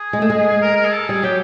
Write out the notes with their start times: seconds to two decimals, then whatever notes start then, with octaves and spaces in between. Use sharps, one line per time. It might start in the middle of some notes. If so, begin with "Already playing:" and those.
Already playing: G#4
0.13 G#3
0.22 A3
0.30 G#3
0.62 A#4
0.76 A#4
0.85 G#4
0.93 A4
1.09 G3 G#4
1.23 F#3 G4